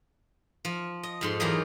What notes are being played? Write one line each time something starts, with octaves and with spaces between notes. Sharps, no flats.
F3
D#5
F2 G#2 C6
E2 F#3 A#3 G4 G#4 D#5